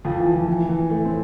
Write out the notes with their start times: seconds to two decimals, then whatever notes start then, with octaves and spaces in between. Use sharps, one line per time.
0.05 F2 F3
0.19 E3
0.34 F2 F3
0.47 E3
0.69 E3
0.89 A2 A3
1.05 C4